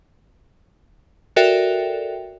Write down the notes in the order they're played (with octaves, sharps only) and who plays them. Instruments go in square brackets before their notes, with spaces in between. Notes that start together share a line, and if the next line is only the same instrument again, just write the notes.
[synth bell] F#4 A4 A#4 D5 E5 G5